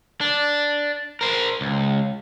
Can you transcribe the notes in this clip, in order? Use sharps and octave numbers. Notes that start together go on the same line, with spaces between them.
D4
A#4 C5
C#2